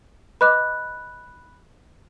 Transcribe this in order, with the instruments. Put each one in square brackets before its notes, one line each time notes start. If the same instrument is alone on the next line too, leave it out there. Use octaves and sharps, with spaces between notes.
[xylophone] B4 D#5 D6 [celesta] B5 F#6